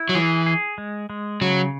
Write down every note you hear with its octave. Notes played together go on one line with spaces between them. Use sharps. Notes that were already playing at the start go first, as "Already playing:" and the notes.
Already playing: E4
F#3
E3 G#4
G#4
G#3
G#3
C#3 F#3